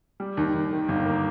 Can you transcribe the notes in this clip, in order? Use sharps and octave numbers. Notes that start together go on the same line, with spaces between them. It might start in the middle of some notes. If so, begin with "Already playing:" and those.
G3
D#2
D#2
D#3
G1
A#3